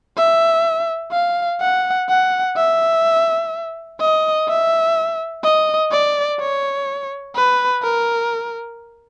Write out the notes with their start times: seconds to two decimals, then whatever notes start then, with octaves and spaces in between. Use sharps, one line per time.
0.17 E5
1.12 F5
1.61 F#5
2.09 F#5
2.56 E5
4.00 D#5
4.48 E5
5.44 D#5
5.92 D5
6.40 C#5
7.35 B4
7.83 A#4